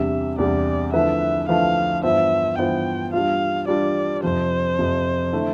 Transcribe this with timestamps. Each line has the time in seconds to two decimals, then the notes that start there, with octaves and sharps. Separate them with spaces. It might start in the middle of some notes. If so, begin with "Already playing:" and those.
Already playing: E2 C3 G3 D4 E5
0.38 E2 C3 G3 D4 D5
0.93 D3 F3 A3 E4 B4 E5
1.48 D3 F3 A3 E4 B4 F5
2.03 G2 E3 B3 F4 C5 E5
2.58 G2 E3 B3 F4 C5 G5
3.13 G3 D4 F4 F5
3.68 G3 D4 F4 D5
4.23 F2 C3 F3 C5
4.78 F2 C3 F3
5.33 D3 A3 E4